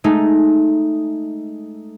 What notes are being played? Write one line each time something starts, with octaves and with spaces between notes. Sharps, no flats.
G#3 A3 D#4